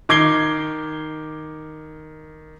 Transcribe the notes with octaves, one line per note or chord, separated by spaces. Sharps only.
D#3 D6 G#6 C7 G7